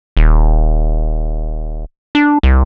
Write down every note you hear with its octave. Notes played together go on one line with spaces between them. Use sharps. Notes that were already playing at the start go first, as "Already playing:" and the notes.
D#1
D4
C2